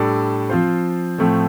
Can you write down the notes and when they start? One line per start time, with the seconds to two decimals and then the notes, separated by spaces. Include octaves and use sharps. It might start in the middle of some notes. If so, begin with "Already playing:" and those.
Already playing: A2 G3 D4 A4 D5
0.50 F3 C4 F4 C5
1.19 A2 F3 A3 C4